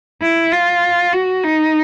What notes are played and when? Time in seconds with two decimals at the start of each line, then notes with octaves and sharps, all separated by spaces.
0.22 E4
0.52 F4
1.13 F#4
1.44 D#4